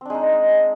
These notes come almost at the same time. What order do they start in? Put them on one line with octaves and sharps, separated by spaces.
C4 D4 G#3 D#4